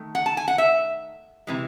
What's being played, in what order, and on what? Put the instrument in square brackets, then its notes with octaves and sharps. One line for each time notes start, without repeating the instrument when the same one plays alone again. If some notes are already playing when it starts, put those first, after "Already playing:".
Already playing: [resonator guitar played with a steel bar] D#3 A3
F#5
A5
G#5
F#5
E5
C3 E3 G#3